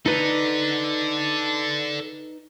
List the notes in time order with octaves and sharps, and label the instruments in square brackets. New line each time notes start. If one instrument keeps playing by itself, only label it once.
[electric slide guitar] D#4 B4 [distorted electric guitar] A4 D5